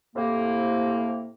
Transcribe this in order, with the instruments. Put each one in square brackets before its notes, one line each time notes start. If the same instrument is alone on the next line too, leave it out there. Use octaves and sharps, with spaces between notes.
[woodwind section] A2 C3 A#3